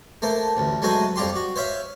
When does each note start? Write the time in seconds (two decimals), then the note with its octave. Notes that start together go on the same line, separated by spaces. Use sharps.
0.22 A3 A#3 C5
0.57 A1 D2
0.82 F#3 G#3 A3 F#4 C5 D#5
1.16 F2 G3 F4 G4 C6
1.36 F#4
1.56 C5 C#5 E5 F5